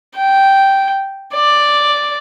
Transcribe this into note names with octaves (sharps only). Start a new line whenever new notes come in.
G5
D5